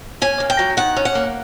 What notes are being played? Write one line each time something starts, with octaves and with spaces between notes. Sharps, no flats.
C#4 G#5
A#3
G5
F#3
D#3 F#5
C#4
F#5
A#3